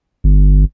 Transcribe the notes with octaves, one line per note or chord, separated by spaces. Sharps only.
G1